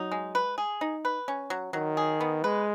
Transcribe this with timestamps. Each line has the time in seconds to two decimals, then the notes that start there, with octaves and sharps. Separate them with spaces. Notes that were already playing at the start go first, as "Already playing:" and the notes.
Already playing: F#3 D#4
0.12 G#3
0.35 B4
0.58 G#4
0.81 D#4
1.05 B4
1.28 C#4
1.50 F#3
1.73 D#3 F#3
1.97 G#4
2.21 B3
2.44 G#3 B4